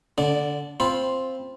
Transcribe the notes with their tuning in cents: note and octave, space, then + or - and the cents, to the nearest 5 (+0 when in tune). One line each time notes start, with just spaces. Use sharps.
D3 +0 D4 -35 D5 +0
C4 +5 F4 +0 B5 +0